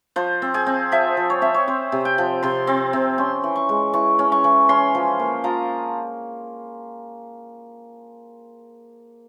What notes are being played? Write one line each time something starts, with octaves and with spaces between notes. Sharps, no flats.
F3 C5
C4
G#4
C4
F3 E5
F3
C#5
C4 E5
C#5
C4 C5
C3
G5
F3
C3 C6
C4
C3
C#4 C6
E3
C#6
G#3
E3 C#6
C#4
C#6
E3
C#4 C6
F3
A#3
F3 A#5